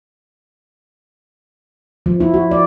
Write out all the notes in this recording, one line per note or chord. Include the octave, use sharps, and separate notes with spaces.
F3
E4
F#4
D5